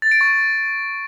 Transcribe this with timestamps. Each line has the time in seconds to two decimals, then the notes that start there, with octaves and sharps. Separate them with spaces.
0.02 A6
0.11 D7
0.21 C#6